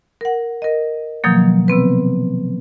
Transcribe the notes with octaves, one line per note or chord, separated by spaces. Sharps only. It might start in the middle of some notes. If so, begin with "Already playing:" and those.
A#4 F#5
A#4 D#5
B2 D#3 F3 F#3 A#3
C3 B3 C4 B4